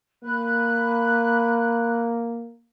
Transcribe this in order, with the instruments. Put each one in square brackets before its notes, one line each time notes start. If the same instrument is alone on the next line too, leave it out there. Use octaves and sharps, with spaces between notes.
[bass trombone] A#3 [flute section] B5 F#6